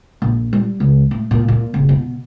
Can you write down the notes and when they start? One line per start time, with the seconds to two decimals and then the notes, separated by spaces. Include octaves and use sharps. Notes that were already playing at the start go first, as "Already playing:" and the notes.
0.22 A#1
0.53 G3
0.80 C#2
1.11 A2
1.31 A#2
1.48 A#2
1.74 F#1
1.89 B2